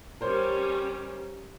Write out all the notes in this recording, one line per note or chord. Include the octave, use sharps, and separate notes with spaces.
G3 C#4 A#4 C5 C#5